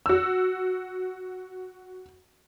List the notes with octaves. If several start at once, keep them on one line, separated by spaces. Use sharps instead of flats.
F#4 E6